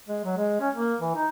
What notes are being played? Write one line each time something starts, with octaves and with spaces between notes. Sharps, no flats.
G#3
F#3
G#3
C#4
A#3
E3
D#4